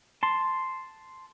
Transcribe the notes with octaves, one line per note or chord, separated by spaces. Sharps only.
A5 C6